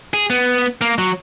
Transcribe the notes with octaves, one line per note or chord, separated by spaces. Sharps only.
G#4
B3
A#3
F#3